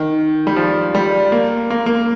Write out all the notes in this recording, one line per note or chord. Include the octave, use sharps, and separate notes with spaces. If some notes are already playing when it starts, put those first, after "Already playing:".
Already playing: D#3
G3
F3
G3
A#3
A#3
A#3